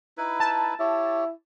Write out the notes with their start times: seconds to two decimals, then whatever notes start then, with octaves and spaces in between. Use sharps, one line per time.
0.18 D#4 E4 B4
0.40 A5
0.80 E4 G4 C#5